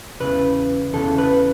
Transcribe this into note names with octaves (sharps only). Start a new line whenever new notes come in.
E2 C#3 E3 B4
E2 C#3 E3 A4
B4